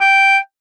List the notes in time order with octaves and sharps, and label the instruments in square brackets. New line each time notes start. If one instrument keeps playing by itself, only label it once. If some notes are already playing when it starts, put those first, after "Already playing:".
[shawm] G5